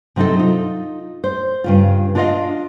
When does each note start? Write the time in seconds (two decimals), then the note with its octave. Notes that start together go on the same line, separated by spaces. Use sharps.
0.16 C3 F#3 C4 D#4 A4
0.39 D#4 F4
1.24 C5
1.64 G2 C#3 F4
2.15 D4 F4 F#4 D5 D#5 F5